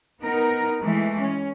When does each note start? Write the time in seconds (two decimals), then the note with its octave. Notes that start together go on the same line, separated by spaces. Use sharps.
0.22 B3 D#4 A#4
0.81 E3 G#3 A3
1.21 C#4